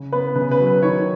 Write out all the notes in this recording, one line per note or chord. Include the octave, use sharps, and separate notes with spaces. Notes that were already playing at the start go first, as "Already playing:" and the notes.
Already playing: C#3
B3 B4
C#3 B4
B4
F#3
B4
D#3 C#5